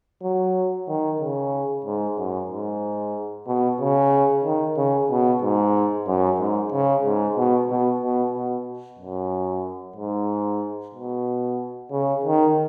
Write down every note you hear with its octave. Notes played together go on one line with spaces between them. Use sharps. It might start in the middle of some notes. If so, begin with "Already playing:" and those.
F#3
D#3
C#3
G#2
F#2
G#2
B2
C#3
D#3
C#3
B2
G#2
F#2
G#2
C#3
G#2
B2
B2
B2
B2
F#2
G#2
B2
C#3
D#3